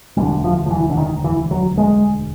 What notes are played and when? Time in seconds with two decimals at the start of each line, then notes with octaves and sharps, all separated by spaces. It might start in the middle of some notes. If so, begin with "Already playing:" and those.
0.17 E1 D2 D3 G3
0.44 F3
0.66 F3
0.70 E3
0.90 D3
0.97 D#3
1.24 E3
1.51 F#3
1.77 G#3